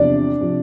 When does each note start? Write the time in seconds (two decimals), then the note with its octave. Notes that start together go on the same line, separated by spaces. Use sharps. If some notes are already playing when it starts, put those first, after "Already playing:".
Already playing: E2 C3 F3 D4 D5
0.41 C3 F3